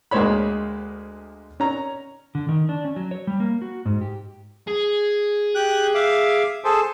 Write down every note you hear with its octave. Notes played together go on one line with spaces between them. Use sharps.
D2 G#3 A#3 C5 C#5 B5
C#4 A#5
D3
D#3
D4
C#4
F#3
C#5
G3
A#3
F#4
G#2
G4
G#4
G4 F#6
E5 F5 D6
G#4 A4 C5